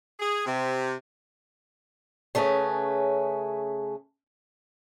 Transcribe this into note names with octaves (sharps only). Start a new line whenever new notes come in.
G#4
C3
C#3 A3 C#4 G#4 B4